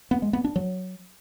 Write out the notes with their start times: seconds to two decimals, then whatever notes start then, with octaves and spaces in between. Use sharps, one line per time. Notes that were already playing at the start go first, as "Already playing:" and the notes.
0.11 B3
0.22 G#3
0.33 B3
0.44 D4
0.56 F#3